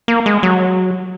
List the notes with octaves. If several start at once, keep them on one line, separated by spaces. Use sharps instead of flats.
A#3
G#3
F#3